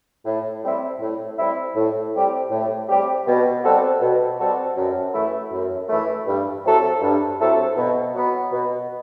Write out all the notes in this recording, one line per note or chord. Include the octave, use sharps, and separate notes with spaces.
A2
G3 C4 E4
A2
G3 C4 E4
A2
G3 C4 G4
A2
G3 C4 G4
B2
G3 C4 F#4 A4
B2
G3 C4 F#4 A4
F#2
E3 A3 E4
F#2
E3 A3 E4
G2
F#3 C4 E4 A4
G2
F#3 C4 E4 A4
B2
F#3 B3
B2